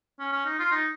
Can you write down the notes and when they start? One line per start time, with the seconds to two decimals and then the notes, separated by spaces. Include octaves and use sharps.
0.19 C#4
0.32 C#4
0.46 D#4
0.59 F4
0.72 D#4